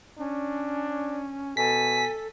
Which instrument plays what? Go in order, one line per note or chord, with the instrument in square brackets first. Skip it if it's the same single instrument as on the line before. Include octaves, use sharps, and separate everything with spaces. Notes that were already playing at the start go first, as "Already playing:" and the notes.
[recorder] C#4 [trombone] D4
[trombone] B2 [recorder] A4 [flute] G#5 [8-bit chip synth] B6